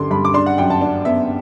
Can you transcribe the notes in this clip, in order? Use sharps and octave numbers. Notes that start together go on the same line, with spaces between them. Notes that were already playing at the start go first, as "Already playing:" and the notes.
Already playing: G2 D3 G3 C6 D6
G2 B5
D6
D4 C6
F#5
F#2 G5
A5
D4
B3 E5